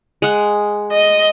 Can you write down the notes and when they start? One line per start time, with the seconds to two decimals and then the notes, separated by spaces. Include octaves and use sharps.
0.22 G#3 F#5
0.92 D#5